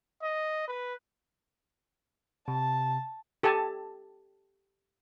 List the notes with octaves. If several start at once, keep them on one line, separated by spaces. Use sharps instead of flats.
D#5
B4
C3 A5
G4 A4 G#5 A5